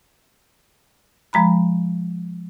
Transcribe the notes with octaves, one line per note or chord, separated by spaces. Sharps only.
F3 G#3 A#5 B5